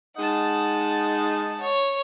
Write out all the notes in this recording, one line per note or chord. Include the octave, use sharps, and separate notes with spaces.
G#3 D#4 F#5 A5
C#5